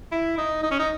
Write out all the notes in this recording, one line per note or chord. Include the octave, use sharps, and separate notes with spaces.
E4
D#4
D#4
C#4
D#4